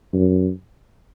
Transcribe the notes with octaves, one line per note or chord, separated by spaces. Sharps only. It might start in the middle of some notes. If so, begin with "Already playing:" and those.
F#2